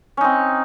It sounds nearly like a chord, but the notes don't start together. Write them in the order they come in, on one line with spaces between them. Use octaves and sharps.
C#4 D#4 C4